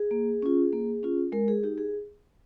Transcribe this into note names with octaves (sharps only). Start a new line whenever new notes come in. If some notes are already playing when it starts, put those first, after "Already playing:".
Already playing: G#4
A#3
C#4 F4
A#3
C#4 F4
G#3 A#4
G#4
D#4 G4
G#4